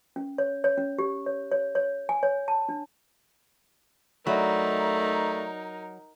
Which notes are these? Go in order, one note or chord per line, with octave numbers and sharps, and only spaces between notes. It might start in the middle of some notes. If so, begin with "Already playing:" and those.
C#4
C#5
C#5
C#4
G4
C#5
C#5
C#5
G#5
C#5
A5
D4
F#3 A3 D#4 A#4 D5 E5 B5